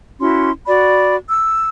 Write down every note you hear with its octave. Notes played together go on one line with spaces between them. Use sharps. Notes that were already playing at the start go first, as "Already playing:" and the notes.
C#4 E4 F#4 C6
F#4 D5 B5
E6